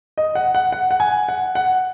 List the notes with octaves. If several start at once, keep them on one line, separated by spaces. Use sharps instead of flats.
D#5
F#5
F#5
F#5
F#5
G#5
F#5
F#5